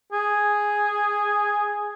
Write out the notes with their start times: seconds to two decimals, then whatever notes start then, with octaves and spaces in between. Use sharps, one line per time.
0.13 G#4